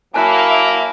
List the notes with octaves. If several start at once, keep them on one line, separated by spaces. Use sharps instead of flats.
F#3 A#3 E4 E5 G#5 A5 F#6